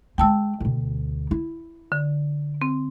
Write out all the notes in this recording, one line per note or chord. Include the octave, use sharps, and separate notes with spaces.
G#3 C4 G5 A5 E6
D2 B2
E4
D3
C4